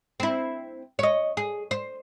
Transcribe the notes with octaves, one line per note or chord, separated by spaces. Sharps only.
C4 E4
C#5 D#5
G#4
C5